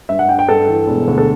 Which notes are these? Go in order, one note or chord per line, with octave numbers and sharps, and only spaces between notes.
G2 E5
F#5
D4 G5
G5
G2 A4
E3
E1
D2
A4